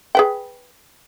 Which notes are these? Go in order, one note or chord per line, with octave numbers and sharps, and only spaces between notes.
G#4 B4 G5